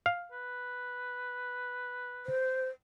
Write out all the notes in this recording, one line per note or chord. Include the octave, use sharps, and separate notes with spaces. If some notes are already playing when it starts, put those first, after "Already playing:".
F5
B4
C5